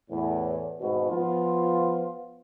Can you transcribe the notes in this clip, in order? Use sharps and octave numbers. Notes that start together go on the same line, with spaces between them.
E2 A2
G#1 B2
F3 B3 F4